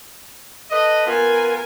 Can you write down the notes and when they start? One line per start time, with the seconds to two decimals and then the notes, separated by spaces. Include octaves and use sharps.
0.71 A4 B4 D#5
1.06 B3 F4 A#4 G#5